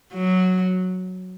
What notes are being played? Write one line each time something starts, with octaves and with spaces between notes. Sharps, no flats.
F#3